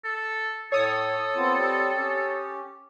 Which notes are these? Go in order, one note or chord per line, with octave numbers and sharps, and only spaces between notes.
A4
A2 A4 C#5 D#6
B3 C4 F4
G3 C4
C#4 G4